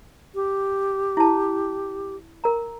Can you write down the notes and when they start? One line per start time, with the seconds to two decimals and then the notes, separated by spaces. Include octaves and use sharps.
0.35 G4
1.17 E4 A5
2.44 A#4 A#5